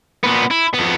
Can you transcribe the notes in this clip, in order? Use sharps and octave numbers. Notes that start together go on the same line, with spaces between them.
A#2 B3
E4
F2 B3